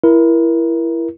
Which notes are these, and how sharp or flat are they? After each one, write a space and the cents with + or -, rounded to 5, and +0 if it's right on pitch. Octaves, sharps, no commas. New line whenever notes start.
E4 +15 A#4 +25